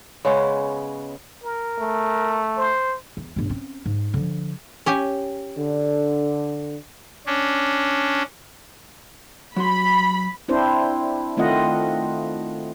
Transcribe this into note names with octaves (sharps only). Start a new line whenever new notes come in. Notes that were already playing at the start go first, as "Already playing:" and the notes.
C#3 G#3 B3 C#4
A#4
A3
C5
E2
G1 A#2
C4 C#4
G#2
D3 F3
C#4 G4 G#5
D3
C#4 D4
F#3 F#4 B5 C6
C4 D4 E4 C5
D#3 A3 C4 F4 D#5 F#5